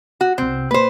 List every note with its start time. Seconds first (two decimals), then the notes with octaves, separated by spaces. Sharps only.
0.21 F#4
0.38 C2 C3 C4
0.71 A#2 A#3 B4 C5